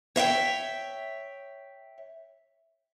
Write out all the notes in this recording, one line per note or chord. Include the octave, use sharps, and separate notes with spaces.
C#5 E5 F5 G5